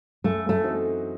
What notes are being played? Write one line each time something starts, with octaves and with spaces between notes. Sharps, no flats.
F#2 A3
A3
E3 C4 D#4 F#4